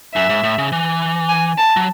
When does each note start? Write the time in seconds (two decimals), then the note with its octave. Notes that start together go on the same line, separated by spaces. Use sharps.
0.15 F#2 E5
0.29 G#2
0.44 A2
0.58 C#3
0.72 E3
1.29 G#5
1.58 A5
1.77 F#3